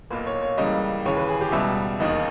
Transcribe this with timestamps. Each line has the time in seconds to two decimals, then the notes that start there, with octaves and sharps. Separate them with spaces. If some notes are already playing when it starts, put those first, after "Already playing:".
0.10 B1 A#2 A#3 B4
0.26 C#5
0.42 C#5
0.57 C#2 C#3 E3 G3 A#3 D#5
1.05 D#2 C#3 E3 C#5
1.17 B4
1.29 G#4
1.41 G4
1.52 C#2 B2 G3 E5
2.00 E1 D#2 D#3 A#3 D#5